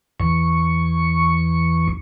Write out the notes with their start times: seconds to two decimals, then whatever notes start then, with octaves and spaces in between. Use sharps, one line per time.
0.20 E2 C#6